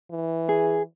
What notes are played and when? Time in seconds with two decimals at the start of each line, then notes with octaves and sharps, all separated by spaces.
0.11 E3
0.49 G#4